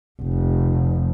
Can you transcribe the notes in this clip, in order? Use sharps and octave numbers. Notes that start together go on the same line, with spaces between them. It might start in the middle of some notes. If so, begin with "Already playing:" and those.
F1